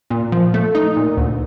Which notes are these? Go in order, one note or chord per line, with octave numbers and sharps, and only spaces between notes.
A#2
F3
A3
D#4
A#2
D2